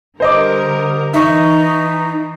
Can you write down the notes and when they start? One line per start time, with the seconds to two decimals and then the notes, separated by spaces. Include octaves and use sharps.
0.20 D3 G3 A#4 C5 D#5 D6
1.14 E3 D#4 E5 C#6